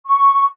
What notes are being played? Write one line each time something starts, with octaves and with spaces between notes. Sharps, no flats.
C#6